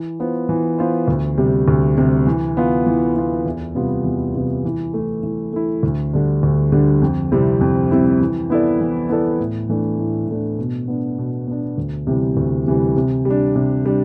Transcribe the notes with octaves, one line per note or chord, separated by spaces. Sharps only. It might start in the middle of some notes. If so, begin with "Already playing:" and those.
Already playing: E3
B3 F4 C5
E3
B3 F4 C5
D2
C3 G3
D2
C3 G3
E3
B3 F4
E3
B3 F4
E2
C3 G3 B3 F4
E2
C3 G3 B3 F4
E3
A3
E4
E3
A3 E4
D2
D3 G3 D4
D2
D3 G3 D4
F2
C3 G3 C4 E4
F2
C3 G3 C4 E4
E3
B3 E4 A4 D5
E3
B3 E4 A4 D5
A2
E3 A3 D4
A2
E3 A3 D4
B2
B3 D4
B2
B3 D4
D2
C3 E3 G3
D2
C3 E3 G3
C3
G3
D4
C3
G3 D4